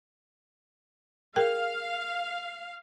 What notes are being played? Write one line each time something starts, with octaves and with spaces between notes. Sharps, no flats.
G#4 A#4 F5 G5